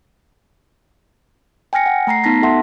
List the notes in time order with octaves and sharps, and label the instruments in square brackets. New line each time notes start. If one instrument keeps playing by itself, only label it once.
[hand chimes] G5 G#5 F6 A#6 C#7
F#5
A3 A#5 A#6 C7
B3 D#4 A5 A#6 B6
F#4 A4 E5 F#5 A5 C6